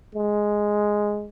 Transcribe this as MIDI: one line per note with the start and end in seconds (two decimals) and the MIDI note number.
0.15 1.29 56